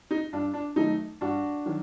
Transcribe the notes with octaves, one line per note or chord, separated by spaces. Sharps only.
D#4
G2 D4
D4
D#3 F#3 A3 D#4
G2 D4 F#4
D#3 F#3